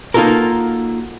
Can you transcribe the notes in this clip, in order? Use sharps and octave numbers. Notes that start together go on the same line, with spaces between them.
A#3 D#4 F4 F#4 A4 A#4